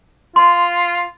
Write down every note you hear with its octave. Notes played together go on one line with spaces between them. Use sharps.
F4 C6